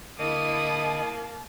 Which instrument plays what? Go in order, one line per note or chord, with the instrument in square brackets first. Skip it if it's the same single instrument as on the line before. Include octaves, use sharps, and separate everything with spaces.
[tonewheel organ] D3 D#5 [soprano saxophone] A#3 [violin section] E4 D#6 [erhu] A5